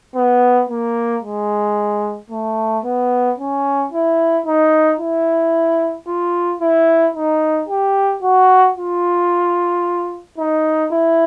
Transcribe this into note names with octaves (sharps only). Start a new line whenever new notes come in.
B3
A#3
G#3
A3
B3
C#4
E4
D#4
E4
F4
E4
D#4
G4
F#4
F4
D#4
E4